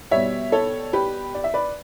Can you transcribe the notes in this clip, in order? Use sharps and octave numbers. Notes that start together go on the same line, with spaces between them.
B2 G3 C#5 E5
A4 C#5
G4 B4
D5
E5
B4 D5